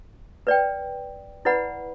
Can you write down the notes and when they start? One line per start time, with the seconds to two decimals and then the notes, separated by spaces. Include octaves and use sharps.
0.47 B4 D5 G5
1.45 E4 B4 D5 F#5 B5